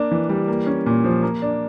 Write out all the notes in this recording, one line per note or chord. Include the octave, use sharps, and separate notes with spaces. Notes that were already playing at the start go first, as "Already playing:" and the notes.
Already playing: A#3 D4
E3
G3
A#3
C#4
A#2
F3
A#3
D4